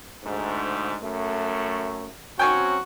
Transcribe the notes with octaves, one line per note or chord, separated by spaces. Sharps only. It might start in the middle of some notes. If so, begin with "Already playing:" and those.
D2 G#2
F#2 A3
F#3 C4 C#4 F#4 G5 G#5 C#6